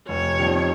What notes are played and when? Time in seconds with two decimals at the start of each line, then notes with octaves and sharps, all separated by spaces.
0.09 F1 C#5
0.38 F2 D#3 G3